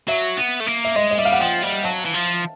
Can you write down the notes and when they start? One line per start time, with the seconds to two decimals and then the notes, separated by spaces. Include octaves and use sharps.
0.08 F#3 E5
0.37 B3
0.60 A3
0.67 A#3
0.85 E5
0.96 G#3 D#5
1.11 D#5
1.18 G3 E5
1.25 F5
1.32 F#5
1.40 F3 G5
1.62 G3
1.84 F#3 A5
2.05 E3
2.14 F3